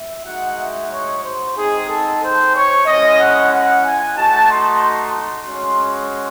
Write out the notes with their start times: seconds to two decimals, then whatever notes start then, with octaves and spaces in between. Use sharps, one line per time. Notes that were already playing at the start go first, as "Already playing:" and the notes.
Already playing: E5
0.25 G#3 D#4 F#4 F#5
0.58 E5
0.92 C#5
1.24 C5
1.56 G#3 C4 D#4 G#4
1.89 A4
2.22 C5
2.54 C#5
2.86 G#3 C#4 E4 D#5
3.19 F#5
3.52 F#5
3.85 G#5
4.17 A3 D#4 F#4 A5
4.50 C6
4.82 C6
5.47 G#3 C#4 F#4